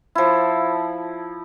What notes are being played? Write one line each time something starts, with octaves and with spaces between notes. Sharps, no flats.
F3 E4